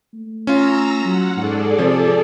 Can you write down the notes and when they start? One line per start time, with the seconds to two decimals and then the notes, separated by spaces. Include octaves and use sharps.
0.14 A3
0.47 C#4 F4 A#5 E6 A#6
1.05 F#3 F#5
1.37 G#2 G#4 A4 D5
1.78 C3 F3